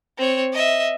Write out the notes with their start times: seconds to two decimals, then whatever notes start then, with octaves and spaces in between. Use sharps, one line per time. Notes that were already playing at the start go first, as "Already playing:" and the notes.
0.18 C4 C#5
0.53 D#5 E5